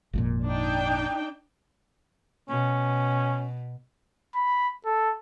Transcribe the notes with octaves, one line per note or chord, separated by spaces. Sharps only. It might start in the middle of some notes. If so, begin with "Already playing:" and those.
G#1 F2 A#2
D4 D#4 G5
B2 C#4
B5
A4